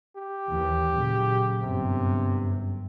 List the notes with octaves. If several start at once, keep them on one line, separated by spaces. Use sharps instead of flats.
G4
D#2 E3
A#2 C#3 F#3
G1 F#2 C3